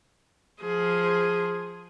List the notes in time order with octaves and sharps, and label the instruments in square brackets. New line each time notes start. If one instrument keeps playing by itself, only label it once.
[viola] F3 G#4